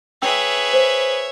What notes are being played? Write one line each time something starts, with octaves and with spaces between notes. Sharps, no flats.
D4 G#4 B4 C#5 E5 G5 E6
C5